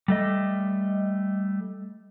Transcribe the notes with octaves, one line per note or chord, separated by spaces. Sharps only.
G3 A3 D#5